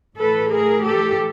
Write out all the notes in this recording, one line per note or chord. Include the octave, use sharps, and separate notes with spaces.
A2 E3 A3 A4 B4
G#4 A#4
G4 A4